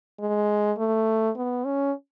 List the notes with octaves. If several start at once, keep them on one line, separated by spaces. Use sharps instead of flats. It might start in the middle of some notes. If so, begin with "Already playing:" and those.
G#3
A3
B3
C#4